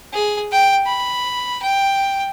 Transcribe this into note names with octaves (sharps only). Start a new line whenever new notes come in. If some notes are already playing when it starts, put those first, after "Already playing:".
G#4
G5
B5
G5